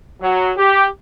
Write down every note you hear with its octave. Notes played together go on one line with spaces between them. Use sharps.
F#3
G4